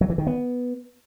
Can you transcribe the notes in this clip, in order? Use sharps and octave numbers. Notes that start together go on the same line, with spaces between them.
F#3
E3
D#3
B3